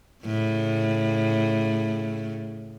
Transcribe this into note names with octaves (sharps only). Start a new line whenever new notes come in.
A2 C#3